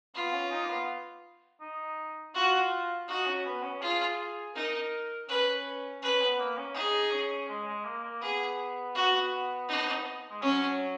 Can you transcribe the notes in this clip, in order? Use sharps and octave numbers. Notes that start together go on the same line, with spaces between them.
B3 F4
C#4
D#4
A#3
B3
D#4
F4 F#4
D#4 F#4
C#4
B3
C#4
F4 G#4
D#4 A#4
C#4 B4
C#4 B4
B3
A#3
C#4
D#4 G#4
C#4
G#3
G#3
A#3
A#3
B3 G#4
F#4
D#4
G#3
F#3 C#4